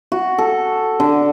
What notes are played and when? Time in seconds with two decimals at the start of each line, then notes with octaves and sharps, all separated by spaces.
0.12 F#4
0.38 A4
1.00 D3